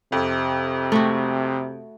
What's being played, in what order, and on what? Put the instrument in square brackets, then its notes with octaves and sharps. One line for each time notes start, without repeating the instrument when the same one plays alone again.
[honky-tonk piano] F2 [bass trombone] C3
[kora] A3 F#4